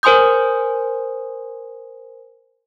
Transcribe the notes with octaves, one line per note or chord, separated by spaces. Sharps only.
A#4 C5 G#5 C6 D#6 G6